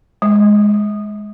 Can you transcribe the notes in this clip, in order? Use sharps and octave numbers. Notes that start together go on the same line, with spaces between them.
G#3